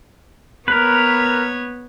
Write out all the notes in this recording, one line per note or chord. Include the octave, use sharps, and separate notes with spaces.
B3 A#4 B4 C#5